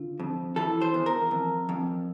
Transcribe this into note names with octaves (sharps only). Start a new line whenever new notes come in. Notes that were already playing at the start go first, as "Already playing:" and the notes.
Already playing: D3 F4
F2
E3 A4
C5
E2
A#4
F2
F2